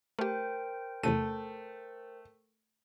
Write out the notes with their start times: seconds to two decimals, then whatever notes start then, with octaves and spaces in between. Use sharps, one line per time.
0.19 A3 G4 A#4 C5 G5
1.03 E2 C3 A3 D#7